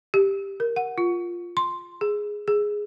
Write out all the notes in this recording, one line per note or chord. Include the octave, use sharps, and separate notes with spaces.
G4
A#4
F#5
F4
C6
G#4
G#4